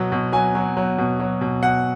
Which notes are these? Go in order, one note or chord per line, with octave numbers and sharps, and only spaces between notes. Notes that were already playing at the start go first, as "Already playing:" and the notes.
Already playing: B2 F#3
B2
F#3 G#5
F#3
F#3
B2
F#3
B2
B2 F#5